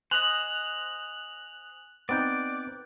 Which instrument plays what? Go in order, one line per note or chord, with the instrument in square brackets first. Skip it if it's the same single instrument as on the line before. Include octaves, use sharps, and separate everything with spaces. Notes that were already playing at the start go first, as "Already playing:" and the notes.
[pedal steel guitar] C5 D#5 [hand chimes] G#5 D#6 [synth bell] F#6 F7 F#7
[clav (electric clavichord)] B3 C4 D#4 [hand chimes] B4 F#6 G6 [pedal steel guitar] D5